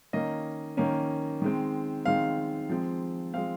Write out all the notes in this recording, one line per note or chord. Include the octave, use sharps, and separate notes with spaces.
D#3 A#3 C#4 D#5
D#3 A#3 C#4
D#3 G#3 C4
D#3 G#3 C4 F5
F3 G#3 C4
F3 G#3 C4 F5